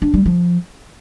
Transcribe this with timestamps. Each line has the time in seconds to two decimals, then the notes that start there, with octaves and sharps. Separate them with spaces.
0.02 D4
0.14 G3
0.26 F3